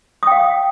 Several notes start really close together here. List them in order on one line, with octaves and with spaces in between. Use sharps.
D#6 G5 F5